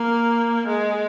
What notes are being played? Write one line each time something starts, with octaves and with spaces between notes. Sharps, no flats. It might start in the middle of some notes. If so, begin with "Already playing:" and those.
Already playing: A#3
G#3